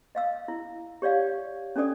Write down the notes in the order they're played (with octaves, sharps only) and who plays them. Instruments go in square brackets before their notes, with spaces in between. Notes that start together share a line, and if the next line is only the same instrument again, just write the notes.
[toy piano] D#5 F5 E6
E4
G4 C#5 D5 F5
C#4 D4 A4 D5 D#6